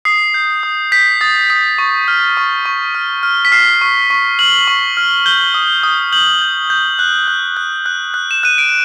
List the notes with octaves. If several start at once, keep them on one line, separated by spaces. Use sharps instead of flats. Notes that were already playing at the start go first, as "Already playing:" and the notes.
D#6 C7
G6
D#6
G6 B6
D#6 A6
D#6 B6
C#6
F6
C#6
C#6
F6
F6
B6
F6 C7
C#6
C#6
F6 F#7
C#6
F6
G6 G7
D#6
D#6
G6 F#7
G6
G6
F#6
F#6
F#6
F#6
F#6
E7
F#6 D#7
D7